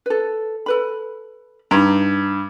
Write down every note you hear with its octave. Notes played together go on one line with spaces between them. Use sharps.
A4 B4
A4 B4 B5
G2 D#4 A#5